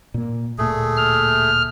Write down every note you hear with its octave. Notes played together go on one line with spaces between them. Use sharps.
A#2 A#3
D1 A#2 A3 A#3 G#4
F6